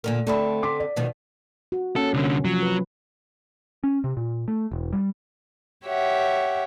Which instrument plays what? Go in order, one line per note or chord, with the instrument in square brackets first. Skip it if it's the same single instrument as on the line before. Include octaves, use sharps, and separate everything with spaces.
[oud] A#2 D3 A#4
[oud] D3 C4 D4 [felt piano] A3 B5
[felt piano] C6 D6 B6
D5
[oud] B2 D#3 F3
[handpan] F#4
[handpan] A#3 C#4 F#5 [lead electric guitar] A4
[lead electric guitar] C2 D3 [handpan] C#4
[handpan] C3 F3 [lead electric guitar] F#3
[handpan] B4
[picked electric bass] C#4
C3
A#2
A3
E1
G3
[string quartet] G4 C#5 E5 F#5